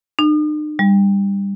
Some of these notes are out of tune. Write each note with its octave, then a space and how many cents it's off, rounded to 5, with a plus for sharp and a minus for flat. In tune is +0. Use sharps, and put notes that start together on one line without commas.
D#4 -45
G3 +20